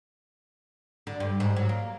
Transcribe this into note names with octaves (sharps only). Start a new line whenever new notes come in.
D3
G2
G#2
F#3
A#3